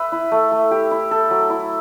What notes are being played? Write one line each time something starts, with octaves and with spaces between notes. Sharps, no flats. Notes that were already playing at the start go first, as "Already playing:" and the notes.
Already playing: B4 E5
E4
A3
A3
G4
E4
A4
F#3
E4